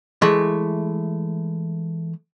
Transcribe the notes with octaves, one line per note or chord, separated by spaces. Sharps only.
E3 G#3 A3